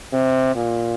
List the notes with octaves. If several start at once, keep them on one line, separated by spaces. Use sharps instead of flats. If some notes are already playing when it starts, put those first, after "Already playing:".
C3
A#2